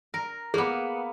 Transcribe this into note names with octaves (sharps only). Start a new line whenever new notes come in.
A#4
A#3 B3 G#4